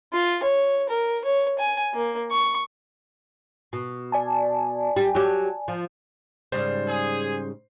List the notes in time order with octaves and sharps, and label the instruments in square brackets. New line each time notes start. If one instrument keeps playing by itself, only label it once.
[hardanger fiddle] F4
C#5
A#4
C#5
G#5
A#3
C#6
[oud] B2
[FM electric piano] D5 G#5 A5
[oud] G3
F#3 G4
F3
[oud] G#2 C#3 G3 [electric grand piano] C5
[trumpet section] G#4